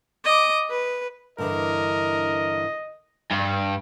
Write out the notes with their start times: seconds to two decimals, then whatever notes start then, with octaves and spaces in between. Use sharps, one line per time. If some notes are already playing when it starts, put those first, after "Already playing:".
0.25 D#5 D6
0.70 B4
1.38 G2 D3 E3 A#4 D#5
3.31 G2